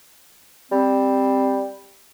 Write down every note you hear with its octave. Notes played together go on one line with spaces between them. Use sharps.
G3 C4